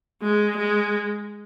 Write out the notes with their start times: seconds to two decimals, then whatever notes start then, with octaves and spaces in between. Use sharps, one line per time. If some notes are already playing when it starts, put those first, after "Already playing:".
0.22 G#3
0.58 G#3